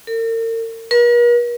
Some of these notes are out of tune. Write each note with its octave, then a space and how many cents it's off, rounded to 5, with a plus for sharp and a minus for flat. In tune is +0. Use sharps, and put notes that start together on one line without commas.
A#4 -40
A#4 +45